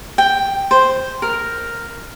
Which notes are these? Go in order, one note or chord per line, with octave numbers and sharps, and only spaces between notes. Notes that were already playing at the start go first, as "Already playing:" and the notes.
G5
C5
A#4